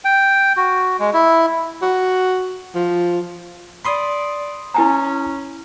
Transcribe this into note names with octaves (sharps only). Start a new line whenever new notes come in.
G5
F#4
G#3
E4
F#4
F3
D5 B5 C6 D#6
C#4 E4 G#5 A#5